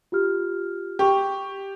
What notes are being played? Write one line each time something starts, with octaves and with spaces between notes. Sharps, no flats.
F4 G4 F6
G4 G5 C#6